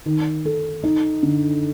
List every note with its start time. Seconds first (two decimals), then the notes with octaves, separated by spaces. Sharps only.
0.06 D#3
0.45 A4
0.84 D#4
1.23 D3